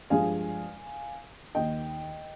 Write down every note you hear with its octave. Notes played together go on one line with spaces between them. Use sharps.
G2 F3 G#3 F5 G#5
D#2 D#3 A#3 D#5 G5